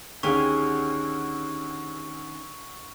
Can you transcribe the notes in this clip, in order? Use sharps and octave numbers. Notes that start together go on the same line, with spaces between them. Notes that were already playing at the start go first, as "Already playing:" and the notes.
D2 D#3 C#4 G4 G#4 F5 C#6